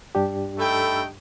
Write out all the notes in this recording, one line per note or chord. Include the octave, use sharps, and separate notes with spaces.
G2 D4 G4
A3 D#4 A4 G5 B5 E6